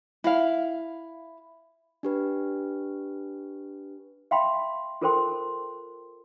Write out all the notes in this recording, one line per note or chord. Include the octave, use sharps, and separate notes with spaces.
E4 F5
D4 G4 B4
E5 F5 G5 B5 C6
F4 A4 A#4 C5 G5 C6